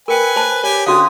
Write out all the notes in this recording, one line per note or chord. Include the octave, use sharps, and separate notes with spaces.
A#4 B4 G5 G#5
C5 A5
G4 C#5 G#5
D3 C#4 F#4 F5 D#6